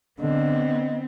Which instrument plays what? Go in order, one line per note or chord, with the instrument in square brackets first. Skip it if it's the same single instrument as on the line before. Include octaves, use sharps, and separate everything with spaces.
[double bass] D3 [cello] B3 C4 [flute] D#5